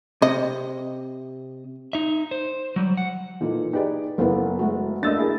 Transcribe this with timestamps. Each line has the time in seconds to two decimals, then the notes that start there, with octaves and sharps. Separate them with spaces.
0.22 C3 D#5
1.93 D#4 E5
2.31 C5
2.76 F#3 G3
2.97 F#5
3.41 A#2 E3 D#4 A4
3.73 D#4 G4 G#4 B4 D5
4.18 F#1 A#3 B3 E4 A4
4.59 G#3 A3 F#4
5.03 A3 A#3 D4 D#5 E6 A6
5.17 E4 G#4 A#4